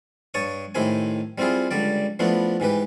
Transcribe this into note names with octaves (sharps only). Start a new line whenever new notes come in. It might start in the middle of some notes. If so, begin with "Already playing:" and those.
G2 C#5 A5 C#6 D#6
A2 D#3 E4 G4 C5 G#5
G3 C4 E4 F4 G#4
C#2 D3 G3 D5
F3 A3 B3 D4 E4
G#2 E3 G4 B4